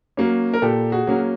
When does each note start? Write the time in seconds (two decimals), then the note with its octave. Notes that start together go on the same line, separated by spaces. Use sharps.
0.17 F#3 A#3 C#4
0.54 A#4
0.62 A#2 G4 A4
0.92 F#4 G#4
1.07 F#3 A#3 C#4